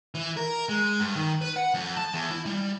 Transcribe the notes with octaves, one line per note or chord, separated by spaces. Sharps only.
E3
A#4
G#3
G2
D#3
B4
F#5
F2
A5
E2
E4
G3